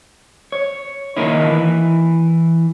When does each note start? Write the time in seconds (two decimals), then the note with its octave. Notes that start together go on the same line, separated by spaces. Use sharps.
0.52 C#5
1.17 D#3 A#3 D#4 E4
1.50 E3